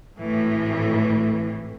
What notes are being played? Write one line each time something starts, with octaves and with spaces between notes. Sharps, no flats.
G#1 A2 E3